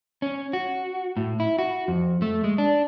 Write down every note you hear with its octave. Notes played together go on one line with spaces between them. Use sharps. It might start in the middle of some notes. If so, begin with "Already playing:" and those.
C#4
F#4
A2
E4
F#4
F2
A3
G#3
D4